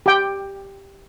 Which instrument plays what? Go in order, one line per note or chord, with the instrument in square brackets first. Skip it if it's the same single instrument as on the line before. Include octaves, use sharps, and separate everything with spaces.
[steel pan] G4 G5